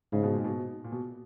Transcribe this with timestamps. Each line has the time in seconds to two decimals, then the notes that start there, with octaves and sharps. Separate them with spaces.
0.13 G#2 C#3
0.23 B2
0.34 A#2
0.44 B2
0.84 A#2
0.92 B2